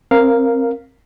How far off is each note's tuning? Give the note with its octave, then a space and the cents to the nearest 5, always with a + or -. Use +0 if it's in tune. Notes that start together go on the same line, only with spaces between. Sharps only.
C4 +25 A#4 +0 F5 +0